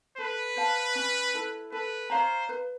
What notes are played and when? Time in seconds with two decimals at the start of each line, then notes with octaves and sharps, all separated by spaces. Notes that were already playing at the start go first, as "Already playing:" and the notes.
0.18 A4 B4
0.56 C5 F5 A5
0.95 C#4
1.34 E4 A4
1.72 A4 B4
2.10 C5 C#5 F5 A#5
2.49 B4